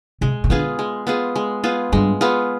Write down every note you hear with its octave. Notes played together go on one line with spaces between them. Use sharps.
C3 G#3
C3
D3 B3 F4 G#4
G#3
B3 F4 G#4
G#3
B3 F4 G#4
G2 G#3
B3 F4 G#4